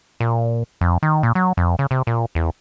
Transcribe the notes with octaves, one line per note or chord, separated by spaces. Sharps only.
A#2
F2
D#3
A#2
F#3
F2
C#3
C3
A#2
E2